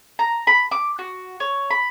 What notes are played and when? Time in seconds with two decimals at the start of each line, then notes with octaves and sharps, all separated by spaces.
0.19 A#5
0.47 B5
0.71 D6
0.99 F#4
1.40 C#5
1.71 B5